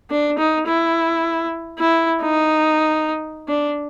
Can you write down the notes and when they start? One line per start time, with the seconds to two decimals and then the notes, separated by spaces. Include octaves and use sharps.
0.10 D4
0.38 D#4
0.67 E4
1.79 E4
2.22 D#4
3.48 D4